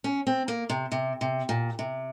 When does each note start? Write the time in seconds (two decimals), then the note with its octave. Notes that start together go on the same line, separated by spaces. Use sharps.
0.04 C#4
0.27 C4
0.48 A#3
0.70 C3
0.92 C3
1.21 C3
1.49 A#2
1.79 C3